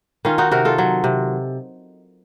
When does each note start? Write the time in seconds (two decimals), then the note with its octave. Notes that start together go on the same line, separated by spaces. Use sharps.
0.25 D#3 C#4 F4
0.38 D#4 F#4
0.51 C3 F#4 A#4
0.65 F4 A4
0.78 F#3
1.04 C3